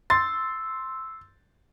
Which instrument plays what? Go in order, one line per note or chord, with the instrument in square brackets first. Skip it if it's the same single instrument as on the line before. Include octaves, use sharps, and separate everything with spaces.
[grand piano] C6 A6 [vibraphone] E6